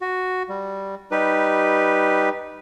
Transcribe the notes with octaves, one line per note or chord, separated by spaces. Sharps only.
F#4
G3
G3 D#4 G4 B4